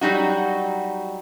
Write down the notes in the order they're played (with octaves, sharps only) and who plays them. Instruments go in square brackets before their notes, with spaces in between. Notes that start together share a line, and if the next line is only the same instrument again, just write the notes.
[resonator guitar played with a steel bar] F#3 G3 D#4 F#4